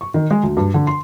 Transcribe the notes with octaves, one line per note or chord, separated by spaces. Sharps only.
C#6
D#3
G#3
D2
G2
D3
C6